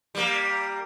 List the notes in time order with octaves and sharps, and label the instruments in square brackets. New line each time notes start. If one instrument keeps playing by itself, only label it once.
[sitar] G3 A#3